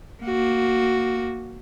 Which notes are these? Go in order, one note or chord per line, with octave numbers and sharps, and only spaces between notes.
A#3 F#4